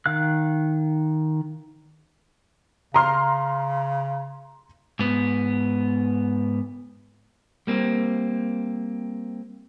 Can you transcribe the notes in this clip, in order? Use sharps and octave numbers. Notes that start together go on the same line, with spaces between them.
D#3 F5 F#6
C#3 A#5 C6 F6
G#2 B3
G3 A#3 C4